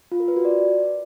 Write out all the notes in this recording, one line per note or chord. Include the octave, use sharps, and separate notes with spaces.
F4
A#4
B4
F#4
D5